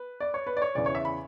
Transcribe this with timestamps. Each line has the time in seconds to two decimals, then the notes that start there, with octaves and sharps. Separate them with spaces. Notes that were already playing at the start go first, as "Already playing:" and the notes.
Already playing: B4
0.20 D5
0.34 C#5
0.47 B4
0.57 D5
0.62 C#5
0.75 E2 C#3 E3 D5
0.86 C#5
0.95 E5
1.05 B5